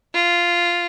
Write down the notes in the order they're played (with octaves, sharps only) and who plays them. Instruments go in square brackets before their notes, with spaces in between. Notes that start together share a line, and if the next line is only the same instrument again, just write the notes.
[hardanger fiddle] F4